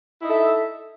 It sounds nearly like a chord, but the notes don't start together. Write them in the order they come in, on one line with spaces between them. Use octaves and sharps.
E4 D#4 A4 E5